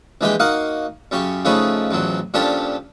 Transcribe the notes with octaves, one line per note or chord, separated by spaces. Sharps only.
A#1 E3 G#3 G4 B4 G5
A#3 D#4 F#4 F5 F#5
F#2 C#3 G4 C#6
C#3 F3 A3 D#4 B4 C#5
A1 E2 F3 F#3
A#2 F3 C#4 D4 G4 A4